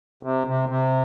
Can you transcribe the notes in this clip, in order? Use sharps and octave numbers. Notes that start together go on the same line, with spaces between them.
C3
C3
C3